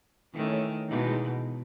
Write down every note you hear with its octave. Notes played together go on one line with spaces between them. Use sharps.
D#3 E3 A3 C#4
B2 E3 G#3 B3 D#4